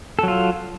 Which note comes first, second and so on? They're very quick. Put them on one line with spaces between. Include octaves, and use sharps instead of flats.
A4 F#3 F4